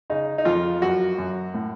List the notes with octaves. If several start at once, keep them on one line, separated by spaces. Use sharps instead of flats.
C#3 D#4
D#4
F2 F4
F#2 F#4
F#2
A2